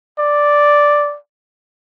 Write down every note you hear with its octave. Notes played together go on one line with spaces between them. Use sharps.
D5